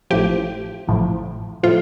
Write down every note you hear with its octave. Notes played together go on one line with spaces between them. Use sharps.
A1 A2 F3 G4
A1 A2 F3
A2 F3 F4